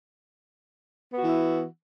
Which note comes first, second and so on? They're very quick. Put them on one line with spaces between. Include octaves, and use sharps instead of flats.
B3 F#4 E3 E4